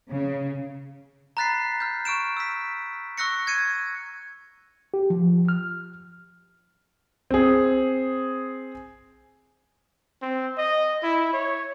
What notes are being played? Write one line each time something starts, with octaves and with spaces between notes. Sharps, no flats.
C#3
A#5 B5 F#6 A6 B6 C7
F6 G6
C#6 F6 D7 E7
E6 B6
C#6 E6 F#6 A#6 C#7
G#6 C#7 D#7
G4
F3
F6
C4 G#4
C4
D#5
E4
C#5